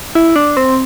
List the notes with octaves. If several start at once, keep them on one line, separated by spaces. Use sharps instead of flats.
E4
D4
C4